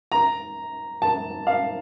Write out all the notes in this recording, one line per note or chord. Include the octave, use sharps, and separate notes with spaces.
A#5
A5
F5